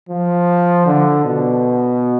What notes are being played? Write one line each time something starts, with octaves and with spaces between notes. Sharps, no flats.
F3
D3
B2